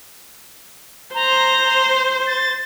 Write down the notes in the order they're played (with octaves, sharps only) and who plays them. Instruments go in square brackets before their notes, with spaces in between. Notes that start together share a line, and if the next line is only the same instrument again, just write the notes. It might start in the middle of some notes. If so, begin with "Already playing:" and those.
[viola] C5 [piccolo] A#5
[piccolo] A6